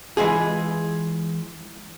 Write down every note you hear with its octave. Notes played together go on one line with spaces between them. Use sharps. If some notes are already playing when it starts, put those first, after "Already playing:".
E3 G#3 F4 G#4